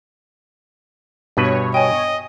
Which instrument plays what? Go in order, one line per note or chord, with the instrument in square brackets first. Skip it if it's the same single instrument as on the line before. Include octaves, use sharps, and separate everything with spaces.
[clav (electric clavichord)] G2 B2 B4 [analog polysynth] C#5
[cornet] D#5 [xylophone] G5 G#5